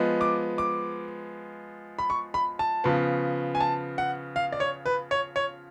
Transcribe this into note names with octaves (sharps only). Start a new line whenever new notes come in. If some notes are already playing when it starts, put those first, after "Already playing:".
Already playing: F3 G#3 B3
D6
D6
B5
C#6
B5
A5
C#3 F3 B3
G#5
A5
F#5
F5
D5
C#5
B4
C#5
C#5